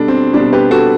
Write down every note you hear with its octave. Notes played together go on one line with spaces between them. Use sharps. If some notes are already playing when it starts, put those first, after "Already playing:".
Already playing: B2 G3 D4 A4
C4
B2 G3 D4
G4 B4
F#4 A4